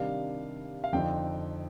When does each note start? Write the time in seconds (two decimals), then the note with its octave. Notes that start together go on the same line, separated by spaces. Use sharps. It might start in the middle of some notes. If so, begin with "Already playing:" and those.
Already playing: C3 D#3 G3 D4 F5
0.84 F5
0.92 F2 D3 F3 C4 D#4 G5